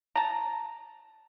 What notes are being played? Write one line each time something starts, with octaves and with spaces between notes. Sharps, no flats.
A5 A#5